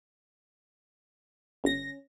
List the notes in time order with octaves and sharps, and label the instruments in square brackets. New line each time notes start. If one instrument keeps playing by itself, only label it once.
[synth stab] G1 A#6 [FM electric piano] C#4